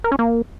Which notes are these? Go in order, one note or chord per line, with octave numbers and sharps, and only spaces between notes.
A#4
C#4
A#3